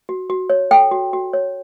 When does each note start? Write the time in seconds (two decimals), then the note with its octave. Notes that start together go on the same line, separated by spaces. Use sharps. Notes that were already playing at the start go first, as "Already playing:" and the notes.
0.09 F#4
0.30 F#4
0.50 C#5
0.71 A4 G5
0.91 F#4
1.13 F#4
1.33 C#5